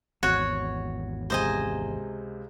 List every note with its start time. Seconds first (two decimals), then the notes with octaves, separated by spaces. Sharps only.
0.23 G#1 E2 F#4 C#5
1.30 C#2 C3 C5 D#5 G#5